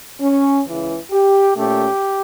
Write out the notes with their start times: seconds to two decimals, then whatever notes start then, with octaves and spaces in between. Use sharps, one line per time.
0.20 C#4
0.66 C#2 C#3 E3
1.11 G4
1.56 A#2 A3 C#4 G4